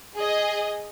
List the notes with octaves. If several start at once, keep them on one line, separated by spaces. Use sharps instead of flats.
G#4 D#5